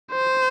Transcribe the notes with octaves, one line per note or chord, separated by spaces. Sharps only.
C5